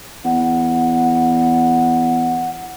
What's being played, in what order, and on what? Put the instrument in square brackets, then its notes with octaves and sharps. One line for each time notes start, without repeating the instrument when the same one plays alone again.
[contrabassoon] E2 [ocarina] F#5